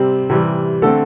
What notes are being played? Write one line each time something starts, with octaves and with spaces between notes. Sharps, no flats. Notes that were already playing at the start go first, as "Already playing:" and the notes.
Already playing: C3 G3 C4
C3 E3 G3
D3 A3 C4 A4